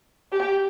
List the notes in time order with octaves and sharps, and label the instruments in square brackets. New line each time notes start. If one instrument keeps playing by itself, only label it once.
[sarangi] G4